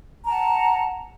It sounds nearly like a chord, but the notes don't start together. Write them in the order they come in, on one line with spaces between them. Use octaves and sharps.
A#5 A5 F#5